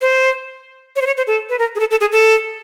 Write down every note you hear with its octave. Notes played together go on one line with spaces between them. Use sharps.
C5
C#5
C5
C#5
C5
A4
B4
A#4
G#4
A4
A4
G#4
A4